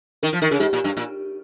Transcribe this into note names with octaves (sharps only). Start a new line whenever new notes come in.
D#3 A#4
F3
D#3 A#4
C#3 G#4
G#2 G4
A#2
G2
A#2